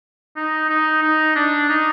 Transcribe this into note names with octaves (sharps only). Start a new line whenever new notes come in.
D#4
D#4
D#4
D4
D#4